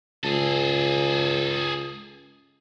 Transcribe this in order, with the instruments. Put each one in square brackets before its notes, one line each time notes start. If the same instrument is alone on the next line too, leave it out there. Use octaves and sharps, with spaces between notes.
[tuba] C#2 [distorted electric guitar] G#4 A4